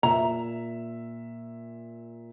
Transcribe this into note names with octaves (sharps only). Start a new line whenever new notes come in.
A#2 E5 A#5